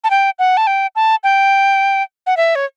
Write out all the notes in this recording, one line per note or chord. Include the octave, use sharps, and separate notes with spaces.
A5
G5
F#5
A5
G5
A5
G5
F#5
E5
C#5